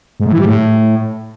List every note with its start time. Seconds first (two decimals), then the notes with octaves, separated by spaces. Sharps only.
0.20 G#2
0.26 A2
0.32 E3
0.39 G3
0.45 A2